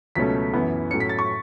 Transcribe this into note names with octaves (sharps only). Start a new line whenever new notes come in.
C#2 B2 F#3 A3 C#4 B6
F#2 E3 B3
A2 F#3 A3 C#4 C#7
B6
A6
C#6